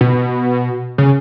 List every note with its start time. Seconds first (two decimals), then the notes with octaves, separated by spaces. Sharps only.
0.01 B2
0.98 C#3